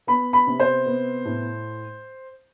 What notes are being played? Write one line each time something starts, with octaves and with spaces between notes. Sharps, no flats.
B3 B5
B5
C3
C5
B3
A2